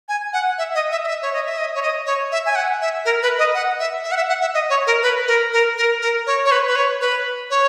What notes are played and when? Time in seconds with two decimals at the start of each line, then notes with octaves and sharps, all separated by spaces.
0.09 G#5
0.33 F#5
0.58 E5
0.75 D#5
0.92 E5
1.04 D#5
1.08 E5
1.22 C#5
1.33 D#5
1.46 E5
1.58 D#5
1.75 C#5
1.83 D#5
2.06 C#5
2.32 E5
2.46 G#5
2.56 F#5
2.81 E5
3.05 A#4
3.22 B4
3.39 D#5
3.54 F#5
3.79 E5
4.04 E5
4.12 F#5
4.17 E5
4.29 F#5
4.41 E5
4.54 D#5
4.70 C#5
4.87 A#4
5.03 B4
5.28 A#4
5.53 A#4
5.77 A#4
6.02 A#4
6.27 C#5
6.45 C#5
6.51 B4
6.67 B4
6.76 C#5
7.01 B4
7.50 C#5